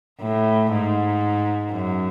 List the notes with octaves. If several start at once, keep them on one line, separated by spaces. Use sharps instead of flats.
A2
G#2
F#2